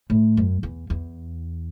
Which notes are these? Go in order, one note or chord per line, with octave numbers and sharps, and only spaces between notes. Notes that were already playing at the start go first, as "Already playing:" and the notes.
A2
F#2
E2
E2